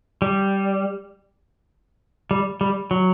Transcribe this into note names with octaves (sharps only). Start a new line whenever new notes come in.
G3
G3
G3
F#3